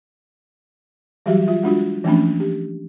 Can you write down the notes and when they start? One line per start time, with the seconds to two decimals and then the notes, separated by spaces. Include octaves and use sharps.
1.26 E3 F#3 G3 F#4 G4 E5
1.48 F4 E5
1.63 G#3 D4 F4 F#4
2.04 E3 F3 A3 A#3 C#4 D4
2.40 G4